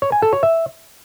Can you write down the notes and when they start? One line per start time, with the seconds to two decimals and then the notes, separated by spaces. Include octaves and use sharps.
0.02 C#5
0.12 G#5
0.22 A4
0.33 C#5
0.43 E5